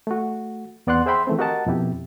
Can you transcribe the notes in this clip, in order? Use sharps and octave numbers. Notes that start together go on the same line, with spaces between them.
A3 F#4
E2 B3 D5 F#5 C6 F#6
G#4 C5 E5 G5 B5 C6
E3 A3 C4
F#4 G4 A#4 D#5 F#5 A5
F2 B2 E4 G4